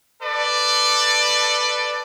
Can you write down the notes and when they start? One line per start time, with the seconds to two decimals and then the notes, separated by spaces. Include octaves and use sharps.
0.22 A4 B4 D5